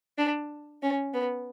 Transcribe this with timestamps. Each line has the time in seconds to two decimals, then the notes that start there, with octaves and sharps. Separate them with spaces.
0.18 D4
0.82 C#4
1.14 B3